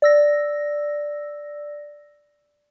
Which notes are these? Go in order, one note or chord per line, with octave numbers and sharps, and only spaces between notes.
D5 E6 A#6